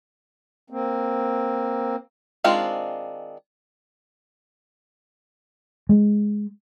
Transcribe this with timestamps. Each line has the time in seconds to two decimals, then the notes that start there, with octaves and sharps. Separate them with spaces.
0.70 A#3 C4
2.44 D#3 G#3 C4 D4 F4
5.89 G#3